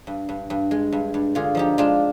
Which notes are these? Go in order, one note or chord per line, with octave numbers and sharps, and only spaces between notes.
G2
G2
G2
G#3
G2
G2
D3 F4 G#4
F3 D#4 G4
G#3 D4 F4